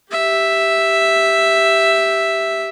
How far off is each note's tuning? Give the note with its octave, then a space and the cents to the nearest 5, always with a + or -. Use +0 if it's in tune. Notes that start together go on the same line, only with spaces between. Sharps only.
G4 +0 E5 +0